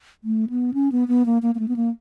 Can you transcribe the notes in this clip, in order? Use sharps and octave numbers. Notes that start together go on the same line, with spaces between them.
A3
B3
C#4
B3
B3
A#3
A#3
A#3
A3
B3
A#3